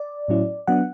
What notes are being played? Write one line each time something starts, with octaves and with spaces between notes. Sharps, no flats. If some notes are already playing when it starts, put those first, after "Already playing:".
Already playing: D5
A2 F#3 C#4 E4
F#3 B3 D4 F#5